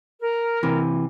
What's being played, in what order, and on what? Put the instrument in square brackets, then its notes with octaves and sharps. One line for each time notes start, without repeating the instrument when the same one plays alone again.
[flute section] A#4
[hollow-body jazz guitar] C3 E3